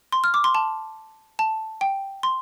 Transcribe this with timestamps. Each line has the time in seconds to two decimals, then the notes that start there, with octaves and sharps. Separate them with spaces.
0.12 C6
0.24 F6
0.34 D6
0.44 C6
0.55 A5
1.39 A5
1.81 G5
2.23 C6